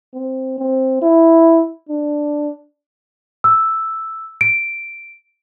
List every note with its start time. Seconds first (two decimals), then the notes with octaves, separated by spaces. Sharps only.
0.14 C4
0.58 C4
1.02 E4
1.89 D4
3.44 E6
4.41 D7